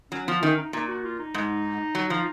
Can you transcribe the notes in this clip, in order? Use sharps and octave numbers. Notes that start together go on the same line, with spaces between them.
F#3 C#4
F3 B3
D#3 C#4
D#4
A#2 D#4
F#4
F4
D#4
G#2
F#3
F3